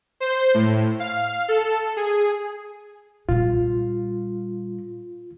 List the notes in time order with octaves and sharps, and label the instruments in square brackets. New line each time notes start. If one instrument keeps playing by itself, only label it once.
[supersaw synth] C5
A2
F5
A4
G#4
[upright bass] A#2 G3 [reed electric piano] F4